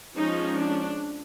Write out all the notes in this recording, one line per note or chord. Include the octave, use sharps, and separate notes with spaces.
F3 G#3 C#4 D#4
D4